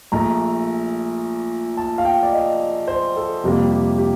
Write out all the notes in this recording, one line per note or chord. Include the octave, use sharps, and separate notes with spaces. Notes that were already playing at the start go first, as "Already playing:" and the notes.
A#1 A#2 A3 A#5
A5
F5
G5
D5
D#5
C5
A4
F2 C3 G3 A#3
G4
G4